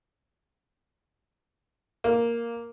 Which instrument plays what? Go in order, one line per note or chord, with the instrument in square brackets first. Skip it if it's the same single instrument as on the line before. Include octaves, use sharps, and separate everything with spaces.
[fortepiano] A#3